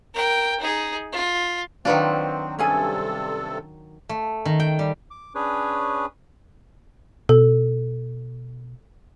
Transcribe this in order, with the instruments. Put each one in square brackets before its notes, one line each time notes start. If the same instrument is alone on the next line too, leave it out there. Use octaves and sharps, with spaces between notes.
[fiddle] A#4 G5
D#4 G#4
F4
[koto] D#3 F#3 D4 [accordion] C4 [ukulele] F4 B4
[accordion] G2 C3 A4 [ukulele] C#4 G#4 G#5
[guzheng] A3
D#3
G5
G3
[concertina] D6
C#4 D4 G#4 B4 C#5
[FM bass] B2 [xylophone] A4